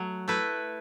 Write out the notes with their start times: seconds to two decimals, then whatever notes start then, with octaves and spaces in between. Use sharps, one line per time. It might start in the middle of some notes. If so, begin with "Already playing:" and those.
Already playing: F#3 A3
0.28 A3 E4 B4